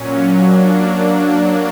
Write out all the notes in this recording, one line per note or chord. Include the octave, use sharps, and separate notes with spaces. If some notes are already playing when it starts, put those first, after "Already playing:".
Already playing: A#2 F#3 C#4
F#3 A#3 D4